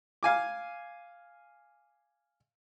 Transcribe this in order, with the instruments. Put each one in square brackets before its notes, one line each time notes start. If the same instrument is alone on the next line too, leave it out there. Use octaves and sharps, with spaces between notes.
[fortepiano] F5 G#5 D6